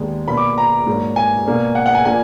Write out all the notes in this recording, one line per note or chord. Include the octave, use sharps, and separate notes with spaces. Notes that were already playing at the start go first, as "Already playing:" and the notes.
Already playing: D#2 D#3 G#3 B3 D4
B2 A#3 D4 B5
D6
A#5
G#2 F#3 A#3 D4
G#5
B2 A#3 D4
F#5
F#5
G#5
F3 A#3 D4 G#5